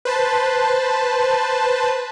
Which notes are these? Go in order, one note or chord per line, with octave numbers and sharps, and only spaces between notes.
B4 C5 A5